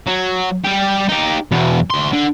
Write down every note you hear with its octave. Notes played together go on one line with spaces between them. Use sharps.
F#3
G3 G4
D#4 G4
E2 B2
D2 C6
D3